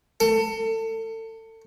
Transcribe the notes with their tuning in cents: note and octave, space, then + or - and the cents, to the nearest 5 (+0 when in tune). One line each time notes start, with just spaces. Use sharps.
A4 +30